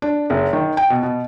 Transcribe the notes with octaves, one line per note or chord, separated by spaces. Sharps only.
D4
F#1
D#3
G5
B2
B2